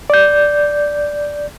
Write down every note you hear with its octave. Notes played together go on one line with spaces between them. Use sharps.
D5 G6